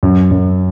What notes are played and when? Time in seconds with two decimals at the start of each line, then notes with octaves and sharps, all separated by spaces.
0.03 F#2
0.31 F#2